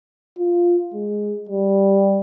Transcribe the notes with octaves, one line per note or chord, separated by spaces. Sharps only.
F4
G#3
G3